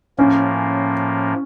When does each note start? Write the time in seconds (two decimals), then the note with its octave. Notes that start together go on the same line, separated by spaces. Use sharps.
0.18 A2 F3 A#3 C#4